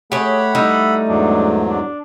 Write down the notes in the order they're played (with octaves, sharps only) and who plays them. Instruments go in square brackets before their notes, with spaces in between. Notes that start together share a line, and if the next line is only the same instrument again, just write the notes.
[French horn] A3 [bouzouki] G4 C#5 [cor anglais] G#4 [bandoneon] F#5 B5
[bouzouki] G3 D#4 [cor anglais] E4
[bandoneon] E2 G#2 F#3 [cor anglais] D4
[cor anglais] D4